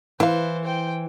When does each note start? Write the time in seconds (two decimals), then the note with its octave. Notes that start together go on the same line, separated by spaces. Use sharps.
0.20 E3 E4 B4 C5 F5
0.64 C5 G5